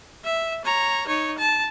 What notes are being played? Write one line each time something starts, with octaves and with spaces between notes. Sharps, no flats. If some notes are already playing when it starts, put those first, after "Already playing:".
E5
C#5 A#5
D#4 C#5
A5